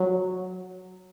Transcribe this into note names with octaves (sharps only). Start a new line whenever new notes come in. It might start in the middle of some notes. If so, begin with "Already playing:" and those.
Already playing: F#3